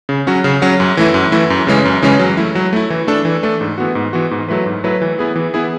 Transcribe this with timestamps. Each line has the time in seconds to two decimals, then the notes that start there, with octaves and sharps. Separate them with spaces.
0.09 C#3
0.27 F#3 C#4 F#4
0.44 C#3
0.62 F#3 C#4 F#4
0.80 F#2
0.97 E3 A3 E4
1.14 F#2
1.32 E3 A3 E4
1.50 F#2
1.67 C#3 E3 G#3 C#4
1.85 F#2
2.02 C#3 E3 G#3 C#4
2.19 F#3
2.37 A3 E4
2.55 F#3
2.73 A3 E4
2.90 E3
3.07 A3 D4 A4
3.25 E3
3.43 A3 D4 A4
3.61 G#2
3.78 E3 B3 F#4
3.95 G#2
4.13 E3 B3 F#4
4.31 G#2
4.48 F#3 A3 E4 B4
4.66 G#2
4.84 F#3 A3 E4 B4
5.02 E3
5.19 B3 E4 G#4
5.36 E3
5.54 B3 E4 G#4